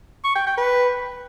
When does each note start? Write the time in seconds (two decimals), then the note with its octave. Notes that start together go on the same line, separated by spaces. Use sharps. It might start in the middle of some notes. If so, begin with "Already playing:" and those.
0.24 C#6
0.35 G5
0.46 G5
0.58 B4